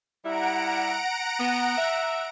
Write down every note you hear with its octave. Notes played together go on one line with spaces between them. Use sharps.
G3 E4 F#5 A#5 D7
B3
E5